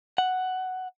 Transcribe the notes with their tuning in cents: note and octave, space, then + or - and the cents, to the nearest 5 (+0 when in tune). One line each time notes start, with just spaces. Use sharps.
F#5 +5